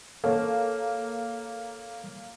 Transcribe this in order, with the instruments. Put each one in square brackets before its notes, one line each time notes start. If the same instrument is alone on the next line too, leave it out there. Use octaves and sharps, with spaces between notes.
[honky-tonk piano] A#3 [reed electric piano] A4 C#5